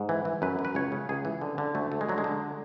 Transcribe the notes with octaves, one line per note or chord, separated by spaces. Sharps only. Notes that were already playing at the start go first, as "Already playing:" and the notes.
Already playing: G#2
E3
E3
F#2 B4
F#2
B4
C#2 C#5
C#3
C#2 G#4
E3
D3
D3
D2 A3
D2 A3
G#3
D3 F#3
G#3
D3